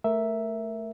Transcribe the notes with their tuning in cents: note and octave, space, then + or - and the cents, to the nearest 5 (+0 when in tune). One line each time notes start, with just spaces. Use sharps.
A3 +0 A#4 +0 E5 +0